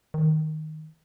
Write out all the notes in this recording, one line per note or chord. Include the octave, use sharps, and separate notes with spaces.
D#3